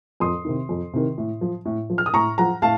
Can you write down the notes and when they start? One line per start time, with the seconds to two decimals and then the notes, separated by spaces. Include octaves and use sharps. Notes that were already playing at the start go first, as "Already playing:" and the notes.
0.20 F2 C6 D#6
0.45 C3 D#3
0.69 F2
0.93 C3 D#3
1.18 A2
1.41 F3
1.65 A2
1.90 F3
1.98 F6
2.06 D#6
2.14 A2 A#5 C#6
2.38 F3 F#5 A#5
2.62 A2 F5 A5